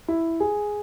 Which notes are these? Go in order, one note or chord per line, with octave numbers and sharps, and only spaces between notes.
E4
G#4